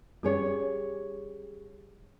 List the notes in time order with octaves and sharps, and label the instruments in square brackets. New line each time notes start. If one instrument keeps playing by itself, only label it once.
[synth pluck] G3 C#4 [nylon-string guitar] G4 G#4 C#5